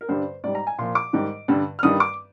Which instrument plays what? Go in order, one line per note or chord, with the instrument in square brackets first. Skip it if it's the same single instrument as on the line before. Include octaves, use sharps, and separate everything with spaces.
[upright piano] A#4
G2 D3 G3 C5
G#2 D5
G3
A#5
G#5
A#2 F3 C6
D6
G#2 D#3 G3
G2 D3 G3
F6
G2 D#3 G3 D#6
D6